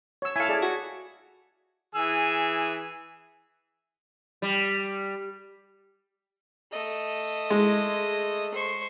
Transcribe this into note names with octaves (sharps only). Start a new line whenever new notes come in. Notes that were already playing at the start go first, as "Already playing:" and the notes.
C#5 E6
E4 A4 F5 G#5
G#4 D5 A5
F#4
E3 G#4 E6
G3
A3 D#5
G#3
C5 C#6